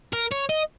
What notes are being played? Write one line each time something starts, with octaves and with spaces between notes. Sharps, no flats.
A#4
C#5
D#5